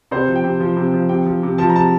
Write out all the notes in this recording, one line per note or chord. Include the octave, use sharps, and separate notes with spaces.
C3 C5
F3
G5
C3
F3
C3
F3
C3 G5
F3
C3
F3 A5
A#5
C3 A5